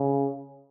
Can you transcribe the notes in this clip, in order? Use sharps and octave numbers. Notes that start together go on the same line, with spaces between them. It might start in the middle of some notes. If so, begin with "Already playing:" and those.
Already playing: C#3